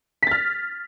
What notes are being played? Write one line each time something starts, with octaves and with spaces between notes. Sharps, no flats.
F6 A6 B6